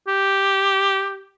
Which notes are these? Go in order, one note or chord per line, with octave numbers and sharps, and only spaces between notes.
G4